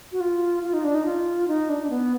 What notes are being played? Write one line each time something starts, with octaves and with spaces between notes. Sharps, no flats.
F#4
F4
F4
D#4
D4
D#4
F4
D#4
D4
D4
B3